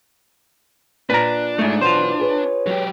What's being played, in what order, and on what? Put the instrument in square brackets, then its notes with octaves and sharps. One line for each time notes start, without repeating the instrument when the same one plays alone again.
[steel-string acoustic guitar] A#2 [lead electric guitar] D4 [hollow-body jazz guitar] B4 A#5
[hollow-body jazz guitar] G#2 A3
[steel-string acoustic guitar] F#2 B2 E3 [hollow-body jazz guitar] F4 C5
[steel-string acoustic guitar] G#4 B4 C#5
[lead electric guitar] F#3 G4